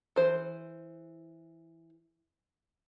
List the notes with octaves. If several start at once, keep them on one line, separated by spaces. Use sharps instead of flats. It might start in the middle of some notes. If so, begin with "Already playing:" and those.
E3 G#4 C5